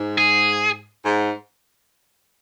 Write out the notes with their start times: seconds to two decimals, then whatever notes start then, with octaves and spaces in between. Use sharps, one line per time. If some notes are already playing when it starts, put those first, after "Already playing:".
Already playing: G#2
0.18 G#4
1.04 G#2